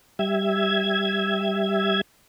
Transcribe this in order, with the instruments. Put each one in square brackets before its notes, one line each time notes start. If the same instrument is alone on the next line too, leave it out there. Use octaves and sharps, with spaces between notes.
[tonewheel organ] G3 E5 G#6